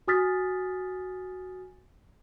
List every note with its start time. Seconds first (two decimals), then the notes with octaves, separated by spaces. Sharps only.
0.08 F#4 G#5 D#6 F6 A6 B6